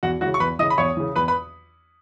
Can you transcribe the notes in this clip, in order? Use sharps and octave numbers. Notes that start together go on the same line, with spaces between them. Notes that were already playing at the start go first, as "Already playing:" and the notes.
E2 F#4 F#5
C#3 E3 F#4 F#5
C#6
E2 B4 B5
C#3 E3 D#5 D#6
B5
E2 C#5 C#6
C#3 E3
E2 B4 B5
B4 B5